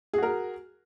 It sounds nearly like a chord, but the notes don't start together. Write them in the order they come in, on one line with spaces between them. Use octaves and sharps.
G#4 F#4 A#4